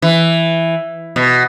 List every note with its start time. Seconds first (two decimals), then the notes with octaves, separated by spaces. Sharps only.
0.02 E3
1.16 B2